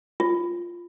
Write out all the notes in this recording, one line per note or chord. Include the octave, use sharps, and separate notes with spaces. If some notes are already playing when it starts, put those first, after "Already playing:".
F4